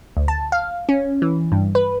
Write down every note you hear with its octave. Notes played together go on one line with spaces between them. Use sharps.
D2
A5
F5
C#4
E3
G2
B4